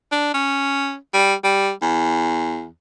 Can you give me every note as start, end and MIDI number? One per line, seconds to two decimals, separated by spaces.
0.12 0.31 62
0.34 0.95 61
1.13 1.34 55
1.44 1.71 55
1.82 2.67 40